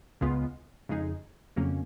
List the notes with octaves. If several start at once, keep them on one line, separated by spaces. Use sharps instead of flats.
C#2 C#3 G#3 B3 F4
F2 C#3 G#3 D#4 G#4
F2 C#3 F#3 A#3 C#4